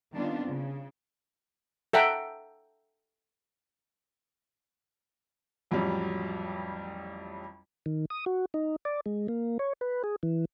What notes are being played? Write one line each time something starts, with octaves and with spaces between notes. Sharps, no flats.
D#3 G3 B3 C4 D4 F4
C#3
A4 E5 F#5 G5 A#5
A1 F2 F#3 G3
D#3
D#6
F#4
D#4
D5
G#3
A#3
C#5
B4
G#4
E3